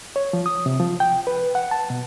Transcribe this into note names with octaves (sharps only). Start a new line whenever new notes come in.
C#5
F3
D#6
C3
F3
G5
B4
F#5
A5
B2